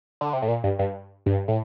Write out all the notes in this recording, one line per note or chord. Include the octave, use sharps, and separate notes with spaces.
D3
C3
A2
A#2
G2
G2
G2
A2